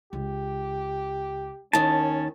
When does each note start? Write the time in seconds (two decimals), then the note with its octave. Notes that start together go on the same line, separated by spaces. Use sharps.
0.13 C#2 G4
1.73 D#2 D#3 C#4 A5